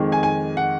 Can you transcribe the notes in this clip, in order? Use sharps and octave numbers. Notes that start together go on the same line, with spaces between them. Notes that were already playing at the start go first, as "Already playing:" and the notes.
Already playing: F2 D#3 G#3
G#5
G#5
F#5